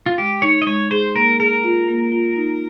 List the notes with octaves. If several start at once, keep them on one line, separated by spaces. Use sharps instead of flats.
F4
G#3 G4
D#4 C#5
D#5
G#3 C#5
G#4 C5
A#3 A#4
G#4 A#4
F4
A#3
F4
D#4